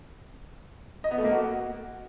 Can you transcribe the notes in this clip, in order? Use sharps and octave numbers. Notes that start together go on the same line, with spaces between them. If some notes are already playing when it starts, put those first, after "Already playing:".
D#5
B3
A3
A#3
F#4